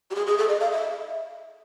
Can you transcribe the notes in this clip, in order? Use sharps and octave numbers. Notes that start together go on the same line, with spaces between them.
G4
G#4
G#4
A4
D#5
F5
E5